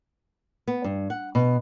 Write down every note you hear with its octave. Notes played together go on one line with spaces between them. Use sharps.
B3
G2
F#5
B2